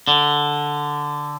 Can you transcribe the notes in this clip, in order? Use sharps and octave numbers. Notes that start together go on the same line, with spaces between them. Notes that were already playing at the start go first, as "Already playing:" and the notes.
D3